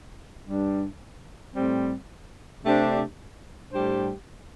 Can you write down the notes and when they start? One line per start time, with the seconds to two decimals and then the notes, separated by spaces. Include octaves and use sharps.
0.46 G2 G3 D4
1.55 A2 G3 C4
2.63 C3 A3 D4 G4 C5
3.72 A2 G3 D4 G4 C5